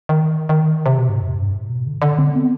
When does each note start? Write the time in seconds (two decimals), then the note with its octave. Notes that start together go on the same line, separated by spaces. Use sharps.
0.09 D#3
0.49 D#3
0.86 C3
0.98 B2
1.09 G#2
1.22 F2
1.38 G2
1.55 G#2
1.70 B2
1.87 D3
2.02 D3
2.19 C4
2.35 B3